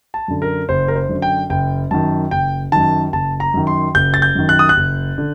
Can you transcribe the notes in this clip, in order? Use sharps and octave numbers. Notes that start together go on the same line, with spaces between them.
A5
F#2 D3
A#4
F#1 C5
A#4
C5
F#2 D3
G5
F#1 G5
F#2 D#3 A5
F#1 G5
F#2 D#3 A5
F#1 A5
A#5
F#2 D#3
C6
F#1 G6
A6
G6
F#2 D#3
F#6
D#6
F#6
F#1
D3